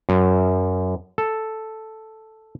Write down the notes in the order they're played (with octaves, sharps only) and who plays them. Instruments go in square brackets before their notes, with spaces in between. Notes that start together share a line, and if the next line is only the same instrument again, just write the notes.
[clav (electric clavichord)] F#2
A4